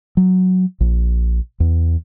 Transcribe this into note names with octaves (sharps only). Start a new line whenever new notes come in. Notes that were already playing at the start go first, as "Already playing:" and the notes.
F#3
A#1
E2